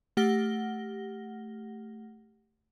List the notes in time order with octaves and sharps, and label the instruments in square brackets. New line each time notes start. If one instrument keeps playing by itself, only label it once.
[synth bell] A3 G4 F#5 F6 A#6 G7